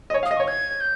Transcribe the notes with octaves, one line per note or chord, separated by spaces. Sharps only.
D#5
C#5
F5
D#6
D#5
C#5 C#6
G#6
G6